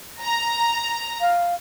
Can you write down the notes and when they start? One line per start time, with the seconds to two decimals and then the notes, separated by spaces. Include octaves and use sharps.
0.21 A#5
1.21 F5